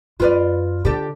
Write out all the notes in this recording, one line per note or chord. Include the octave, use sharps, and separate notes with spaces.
F#2 F4 B4 D5
D3 G4 A4